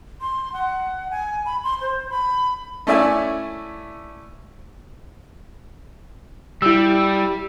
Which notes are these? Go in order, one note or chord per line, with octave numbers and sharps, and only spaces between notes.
C6
F#5
G#5
B5
C6
C5
B5
A3 C#4 E4 D5 E5 G#5
G3 E4 E6